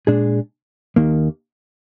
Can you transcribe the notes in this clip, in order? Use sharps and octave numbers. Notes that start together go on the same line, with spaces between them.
A#2 G#3 D4 G#4
D#2 D#3 A#3